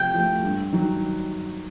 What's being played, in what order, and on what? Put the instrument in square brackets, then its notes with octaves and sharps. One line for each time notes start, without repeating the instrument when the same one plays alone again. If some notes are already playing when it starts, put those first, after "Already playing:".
Already playing: [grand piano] C3 F3 A3 [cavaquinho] G5
[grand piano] F3 A3
G2
D#3 F#3